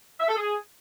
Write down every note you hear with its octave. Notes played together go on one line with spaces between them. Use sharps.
E5
A4
G#4